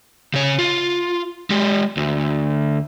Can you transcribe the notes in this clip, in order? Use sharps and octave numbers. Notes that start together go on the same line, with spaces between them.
C#3 C#5
F4
G#3 G4
D2